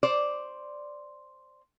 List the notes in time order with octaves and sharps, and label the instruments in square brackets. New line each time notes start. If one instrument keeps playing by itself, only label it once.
[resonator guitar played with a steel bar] C5 D5